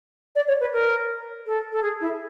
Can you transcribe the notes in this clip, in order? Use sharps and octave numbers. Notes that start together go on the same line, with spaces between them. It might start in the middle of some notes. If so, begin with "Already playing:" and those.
D5
C#5
B4
A#4
A4
A4
G#4
E4